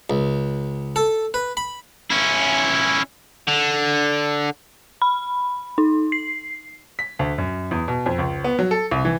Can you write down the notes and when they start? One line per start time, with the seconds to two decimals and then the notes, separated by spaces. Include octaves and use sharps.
0.10 C#2
0.96 A4
1.34 B4
1.57 B5
2.10 C#4 E4
3.48 D3
5.02 B5
5.78 D#4
6.12 C7
6.99 B6
7.19 D2
7.38 F#2
7.71 E2
7.88 B2
8.06 F2
8.18 C#2
8.44 B3
8.59 F#3
8.71 A4
8.91 C2
9.05 E3